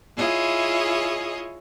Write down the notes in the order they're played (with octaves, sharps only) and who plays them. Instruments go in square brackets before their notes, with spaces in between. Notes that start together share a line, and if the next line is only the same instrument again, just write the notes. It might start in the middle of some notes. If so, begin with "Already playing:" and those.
[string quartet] E4 F4 G#4 C#5 D#5